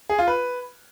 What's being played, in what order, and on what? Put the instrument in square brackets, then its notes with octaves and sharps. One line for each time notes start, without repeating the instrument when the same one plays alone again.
[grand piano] G#4
F4
B4